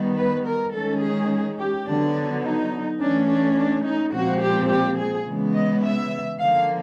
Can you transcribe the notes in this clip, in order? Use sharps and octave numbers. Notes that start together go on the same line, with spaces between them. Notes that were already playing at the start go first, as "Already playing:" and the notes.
Already playing: D#3 G3 B3
B4
A#4
D#3 G#3 C#4 A4
G#4
G4
D3 F#3 B3 D4
D#4
E3 A3 C#4 D4
D4
D4
D#4
A#2 F3 G#3 C4 F#4
G4
G4
G#4
C#3 E3 G#3 B3
D#5
E5
D3 F3 A#3 F5